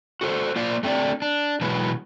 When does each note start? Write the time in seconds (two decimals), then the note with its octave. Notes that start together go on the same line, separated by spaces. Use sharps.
0.21 F#4 A4 C5
0.56 A#3 F4 C5 D5 F5
0.83 A3 C4 D4 C#5 D5
1.22 D4
1.61 B2 E3 F#3 G#3 B4